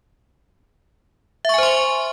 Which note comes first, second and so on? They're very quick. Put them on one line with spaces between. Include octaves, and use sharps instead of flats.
E5 C#6 G#5 C5 C6